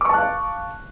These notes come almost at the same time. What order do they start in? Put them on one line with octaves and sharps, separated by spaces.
D6 C#6 A5 F#6 F5